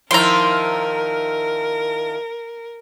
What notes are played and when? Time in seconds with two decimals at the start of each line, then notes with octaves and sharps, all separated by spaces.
0.11 D#3 F3 E4 A#4 A#5 C6